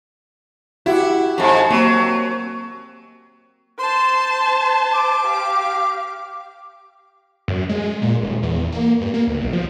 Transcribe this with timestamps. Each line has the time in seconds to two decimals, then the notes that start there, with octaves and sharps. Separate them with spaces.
0.86 E4 F#4 G4 F#5
1.38 F2 G#2
1.70 F#3 A#3 C4
3.79 C5 A5 C6
4.93 D6
5.24 G4 F5
7.48 F#2
7.69 G#3
8.02 A#2
8.22 D#1
8.43 E2
8.72 A#3
9.01 G2
9.14 A#3
9.27 D2
9.40 B1
9.53 F3